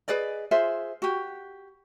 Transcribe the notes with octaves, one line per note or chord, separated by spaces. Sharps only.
G#4 B4 D5 D#5
F4 G#4 C5 E5
F#4 G4